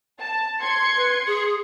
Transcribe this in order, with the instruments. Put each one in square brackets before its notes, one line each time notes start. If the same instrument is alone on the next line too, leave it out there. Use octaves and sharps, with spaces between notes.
[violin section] A5
C6 G#6 C#7
[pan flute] B4
G#4